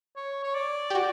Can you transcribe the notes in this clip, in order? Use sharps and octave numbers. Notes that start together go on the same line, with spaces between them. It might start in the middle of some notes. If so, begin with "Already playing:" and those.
C#5
C#5
D5
G4
F#4